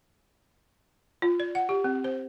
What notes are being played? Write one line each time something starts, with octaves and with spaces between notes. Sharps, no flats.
F4
D5
F#5
G4
C4
C5